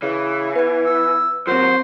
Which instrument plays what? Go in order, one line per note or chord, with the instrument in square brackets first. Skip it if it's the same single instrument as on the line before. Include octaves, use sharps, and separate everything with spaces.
[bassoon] C#3 [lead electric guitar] E3
[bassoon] B3 [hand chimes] B4 G#6
[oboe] E6
[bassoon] D#2 [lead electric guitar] F#3 [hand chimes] C4 F4 [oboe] C5